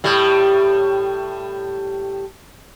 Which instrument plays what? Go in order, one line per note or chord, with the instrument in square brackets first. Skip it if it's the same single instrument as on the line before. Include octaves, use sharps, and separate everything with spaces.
[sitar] A2 G3